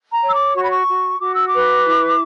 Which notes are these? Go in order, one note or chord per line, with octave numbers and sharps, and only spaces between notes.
A#5
C#5
E6
D6
F#4 C#6
B5
C#6
F#4
F#4 D6
E6
D6
B4
E4